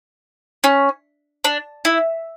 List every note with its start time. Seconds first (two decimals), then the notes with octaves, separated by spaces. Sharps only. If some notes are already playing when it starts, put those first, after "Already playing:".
0.64 C#4
1.45 D4
1.85 E4